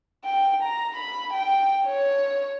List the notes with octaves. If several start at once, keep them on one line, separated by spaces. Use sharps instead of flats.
G5
A#5
B5
G5
C#5